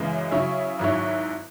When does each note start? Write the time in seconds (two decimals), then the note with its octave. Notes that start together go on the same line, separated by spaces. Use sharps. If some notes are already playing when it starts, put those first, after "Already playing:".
Already playing: F#2 C#3 E3 G#3
0.31 C#3 F#3 E4 C#5
0.79 G#1 G#2 F#3 E4 C#5